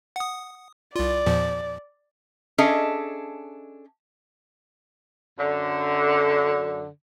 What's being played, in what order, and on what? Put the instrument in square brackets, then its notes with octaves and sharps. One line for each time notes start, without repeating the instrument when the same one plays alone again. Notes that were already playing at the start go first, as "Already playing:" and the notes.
[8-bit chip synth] F#5 D#6
[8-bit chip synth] C2 F4 [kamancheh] D5
[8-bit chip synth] E2 A#2 F3
[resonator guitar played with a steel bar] C#4 D4 G#4 A4 D#5 E5
[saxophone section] F#2 D3